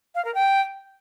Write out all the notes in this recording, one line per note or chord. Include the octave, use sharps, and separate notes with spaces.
F5
A#4
G5